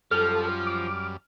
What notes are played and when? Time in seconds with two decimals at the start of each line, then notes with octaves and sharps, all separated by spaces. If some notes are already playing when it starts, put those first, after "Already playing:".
0.11 F#2 F3 G3 A4 F6
0.67 D6